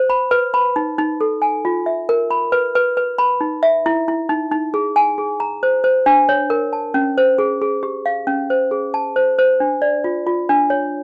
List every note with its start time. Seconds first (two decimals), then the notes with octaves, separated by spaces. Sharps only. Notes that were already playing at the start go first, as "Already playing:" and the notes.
Already playing: C5
0.10 B5
0.31 B4
0.54 B5
0.76 D#4
0.98 D#4
1.21 A4
1.42 G#5
1.65 F4
1.86 E5
2.09 A#4
2.31 B5
2.52 B4
2.75 B4
2.97 B4
3.18 B5
3.41 D#4
3.63 E5
3.86 E4
4.08 E4
4.29 D#4
4.52 D#4
4.74 G#4
4.96 G#5
5.18 G#4
5.40 A#5
5.63 C5
5.84 C5
6.06 D4
6.29 C#5
6.50 A#4
6.73 A5
6.94 C#4
7.18 C5
7.38 G#4
7.62 G#4
7.83 G4
8.06 F5
8.27 C#4
8.50 C5
8.71 G#4
8.94 A5
9.16 C5
9.39 C5
9.60 D4
9.82 D5
10.04 F4
10.27 F4
10.49 D4
10.70 C#5